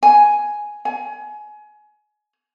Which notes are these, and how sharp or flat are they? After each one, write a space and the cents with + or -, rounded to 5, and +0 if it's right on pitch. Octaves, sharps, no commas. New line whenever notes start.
G#5 +5
G#5 +25